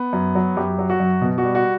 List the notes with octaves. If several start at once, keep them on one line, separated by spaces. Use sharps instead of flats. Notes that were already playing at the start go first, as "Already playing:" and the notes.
Already playing: B3
F#2
F#3
F#2 G4
F#3
F#4
F#2
B2
F#4
G3
F#4